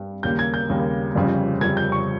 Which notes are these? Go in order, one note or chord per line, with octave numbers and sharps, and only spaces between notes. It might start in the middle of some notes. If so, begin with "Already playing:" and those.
Already playing: G2 G3
D#2 C#3 G3 A#3 G6
G#6
G6
D#2 C#3 G3 A#3
G1 F2 C#3 G3 C#4
G1 F2 C#3 G3 C#4 G#6
G6
C#6